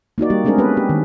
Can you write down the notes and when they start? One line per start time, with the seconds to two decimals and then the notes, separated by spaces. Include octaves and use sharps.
0.18 A#3 D#4 F#4 D5
0.30 G3 A#3 G4
0.44 G#3 A3 C4 D4 G#4 A#4
0.58 B3 C#4 G4 B4
0.77 G4
0.89 D#3